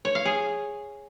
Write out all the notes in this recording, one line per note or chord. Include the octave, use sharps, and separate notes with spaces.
C#5
F5
G#4